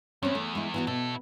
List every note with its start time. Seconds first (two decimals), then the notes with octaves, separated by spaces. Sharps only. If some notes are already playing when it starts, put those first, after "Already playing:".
0.23 E2 C4 C#4
0.35 A3
0.55 G#3 E4
0.74 E3 B3 F#4
0.87 B2 E4 A4